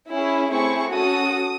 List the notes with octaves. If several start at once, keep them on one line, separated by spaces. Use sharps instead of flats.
C#4 E4 G#4
A3 C4 E4 G#4 C#6
C#4 F#4 A4 D#6